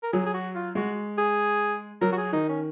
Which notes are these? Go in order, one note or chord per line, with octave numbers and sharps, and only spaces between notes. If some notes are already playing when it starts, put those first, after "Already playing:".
A#4
F#3 G#4
G#4
F#4
F4
G#3 F#4
G#4
F#3 A#4
F#4
G#4
D#3 D#4
C#4